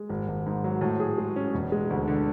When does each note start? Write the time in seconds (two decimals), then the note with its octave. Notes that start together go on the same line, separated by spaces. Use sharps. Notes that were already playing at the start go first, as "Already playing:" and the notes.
Already playing: G#3
0.09 G#1
0.28 G#1
0.46 G#2
0.64 F#3
0.81 A2
1.00 G#4
1.18 G#3
1.36 C#4
1.54 E1
1.72 G#3
1.90 D2
2.08 D3